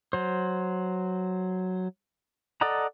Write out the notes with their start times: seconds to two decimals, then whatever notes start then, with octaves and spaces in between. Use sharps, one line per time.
0.13 F#3 C5
2.61 A4 D5 D#5 F#5 A#5